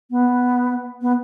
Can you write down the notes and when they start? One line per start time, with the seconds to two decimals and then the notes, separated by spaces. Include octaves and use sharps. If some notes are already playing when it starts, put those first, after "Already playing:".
0.11 B3
1.02 B3